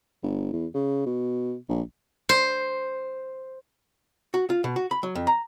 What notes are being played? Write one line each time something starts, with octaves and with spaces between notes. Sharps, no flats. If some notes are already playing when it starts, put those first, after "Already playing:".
G1
E2
C#3
B2
A#1
C5
F#4
F4
B2
F#4
B5
F#3
F2
A#5